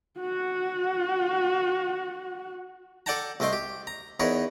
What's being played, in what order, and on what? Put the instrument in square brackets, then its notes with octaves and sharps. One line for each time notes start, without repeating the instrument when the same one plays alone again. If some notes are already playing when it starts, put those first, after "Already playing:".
[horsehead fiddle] F#4 F#5
[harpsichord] A4 D5 F#5 G5 A5 A#5
C2 A3 D#5 G5 C6
G4
A#5
E2 D#4 A#4 B4 C#5